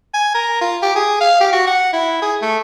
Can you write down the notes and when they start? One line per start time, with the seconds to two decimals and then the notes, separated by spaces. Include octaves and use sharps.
0.14 G#5
0.35 A#4
0.61 F4
0.83 G4
0.95 G#4
1.21 F5
1.40 G4
1.53 F#4
1.67 F#5
1.93 E4
2.22 G#4
2.42 A3